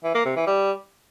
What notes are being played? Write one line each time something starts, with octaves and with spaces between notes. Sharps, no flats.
E3
A#3
C3
E3
G3